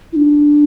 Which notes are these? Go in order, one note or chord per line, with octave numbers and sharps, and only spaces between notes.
E4
D4